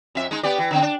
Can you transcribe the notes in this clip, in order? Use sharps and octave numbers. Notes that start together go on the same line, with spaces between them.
F2 E5
G#3 D#4
B3 G4 D5
E3
D3 C4
D4